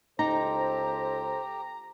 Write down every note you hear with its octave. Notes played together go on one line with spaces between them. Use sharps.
C#2 D#4 G4 A4 C5 A#5